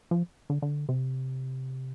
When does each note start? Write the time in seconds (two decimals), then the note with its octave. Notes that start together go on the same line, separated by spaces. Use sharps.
0.11 F3
0.50 D3
0.62 D3
0.89 C3